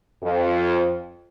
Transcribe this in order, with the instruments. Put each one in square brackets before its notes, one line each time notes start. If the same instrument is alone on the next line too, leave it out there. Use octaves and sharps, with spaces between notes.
[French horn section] F2